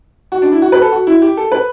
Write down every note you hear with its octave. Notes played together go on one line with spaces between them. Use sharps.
F#4
D4
E4
F#4
B4
A4
F#4
E4
G4
A4
B4